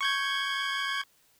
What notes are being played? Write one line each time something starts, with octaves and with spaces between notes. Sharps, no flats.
C#6 G6 G#6